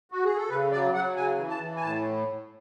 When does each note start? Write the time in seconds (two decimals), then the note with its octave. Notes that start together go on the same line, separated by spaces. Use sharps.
0.12 F#4
0.24 G#4
0.37 A4
0.49 C#3 B4
0.72 F#3 D5
0.94 F#3 F#5
1.16 C#3 G#5
1.38 E3
1.49 A5
1.60 E3
1.76 G#5
1.82 A2 A5